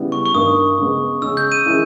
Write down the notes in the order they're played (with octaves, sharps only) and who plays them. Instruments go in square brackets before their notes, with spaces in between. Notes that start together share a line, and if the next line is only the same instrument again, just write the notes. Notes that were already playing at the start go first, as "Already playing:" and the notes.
Already playing: [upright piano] C#3 G3 B3 E4
[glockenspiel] C#6
C#6
[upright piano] G2 D#3 A#3 D#4 [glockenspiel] D#6
[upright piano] C#3 G#3 B3
[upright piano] C#3 G#3 C#4 [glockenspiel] E6
[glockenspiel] G6
D#7
[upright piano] D#3 G#3 C#4 E4